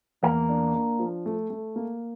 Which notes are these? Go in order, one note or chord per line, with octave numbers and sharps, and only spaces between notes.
E2 A#3
D4
D4
F3
A3
A3
A#3